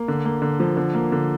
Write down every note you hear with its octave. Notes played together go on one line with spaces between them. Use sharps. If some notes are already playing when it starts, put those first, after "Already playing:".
Already playing: A#3
D3
A#3
D3
F3
D3
A#3
D3